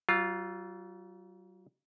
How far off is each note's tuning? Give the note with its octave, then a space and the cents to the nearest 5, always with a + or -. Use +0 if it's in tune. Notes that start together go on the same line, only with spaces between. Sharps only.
F#3 +45 F4 +0